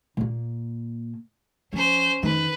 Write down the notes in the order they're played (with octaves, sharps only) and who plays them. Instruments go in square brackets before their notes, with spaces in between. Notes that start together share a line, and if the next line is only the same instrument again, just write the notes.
[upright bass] A#2 A#3
[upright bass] F3 [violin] C#4 C5
[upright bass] F2 D#3 [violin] B4